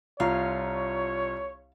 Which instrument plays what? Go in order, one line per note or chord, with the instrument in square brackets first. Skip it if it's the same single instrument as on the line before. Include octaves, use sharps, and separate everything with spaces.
[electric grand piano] C2 F4 A#5 [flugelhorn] C#5 [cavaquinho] F5